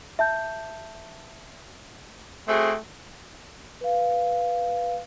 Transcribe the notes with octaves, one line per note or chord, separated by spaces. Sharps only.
E5 A5 G6
A3 C4 F#4 G#4
B4 F5